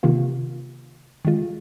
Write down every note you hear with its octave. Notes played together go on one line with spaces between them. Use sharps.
C3 D#3 A#3 F4
D#3 G#3 F4